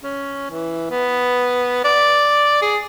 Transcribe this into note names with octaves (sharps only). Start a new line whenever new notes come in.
C#4
E3
B3
D5
G#4